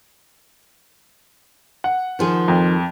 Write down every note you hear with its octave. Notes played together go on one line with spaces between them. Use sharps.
F#5
D#3 F3 G#4
F2